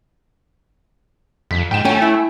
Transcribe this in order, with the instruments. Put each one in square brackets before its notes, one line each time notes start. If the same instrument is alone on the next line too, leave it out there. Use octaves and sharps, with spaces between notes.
[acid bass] F2 [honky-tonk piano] B6
[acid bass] G#2 [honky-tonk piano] G5 E7
[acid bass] A3 [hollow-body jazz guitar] C#4 [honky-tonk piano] G5 G#5
[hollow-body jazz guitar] E4